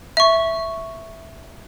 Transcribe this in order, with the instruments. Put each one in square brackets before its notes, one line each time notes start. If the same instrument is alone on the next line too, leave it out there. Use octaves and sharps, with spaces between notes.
[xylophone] E5 C#6